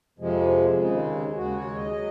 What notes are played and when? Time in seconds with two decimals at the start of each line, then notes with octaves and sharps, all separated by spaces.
0.19 F2 C3 F3 G#3
0.78 D#2 C#3 G#3
1.36 D#2 C#3 G#3 F#4
1.56 C#5
1.76 D#5
1.96 F#3